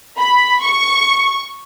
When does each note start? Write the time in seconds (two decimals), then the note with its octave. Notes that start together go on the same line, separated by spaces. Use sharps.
0.18 B5
0.62 C#6